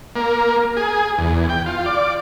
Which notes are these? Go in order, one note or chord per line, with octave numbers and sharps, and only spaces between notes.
A#3
G#4
E2
G5
F4
D5